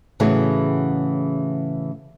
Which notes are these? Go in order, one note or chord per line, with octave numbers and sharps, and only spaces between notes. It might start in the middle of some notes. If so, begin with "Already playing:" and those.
A2 C#3 E3 B3 F#4 G#4